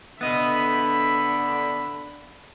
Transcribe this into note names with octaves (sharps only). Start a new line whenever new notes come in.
D3 B3 D#5 E5 B5